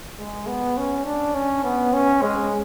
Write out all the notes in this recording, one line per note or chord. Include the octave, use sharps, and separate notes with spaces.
G#3
B3
C#4
D4
C#4
B3
C#4
G#3